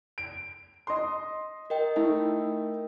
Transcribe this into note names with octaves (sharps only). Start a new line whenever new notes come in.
D7
D#5 C6
A#4 D#5 G5
A3 D#4 E4